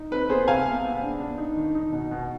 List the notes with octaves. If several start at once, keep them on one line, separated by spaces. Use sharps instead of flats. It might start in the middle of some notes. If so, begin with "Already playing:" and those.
Already playing: D#4
C4 B4
B3 G#4 C5
C3 F5 G#5
B3
B3
D4
D4
D#4
D#3
D#4
B2
B2